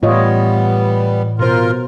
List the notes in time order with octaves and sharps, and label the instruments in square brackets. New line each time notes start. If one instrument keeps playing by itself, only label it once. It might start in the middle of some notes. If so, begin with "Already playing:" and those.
[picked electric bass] A2 E3 A3 [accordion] G3 B3 [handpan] F4 C#5 D#5
[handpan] B2 C5 [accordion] F4 A#4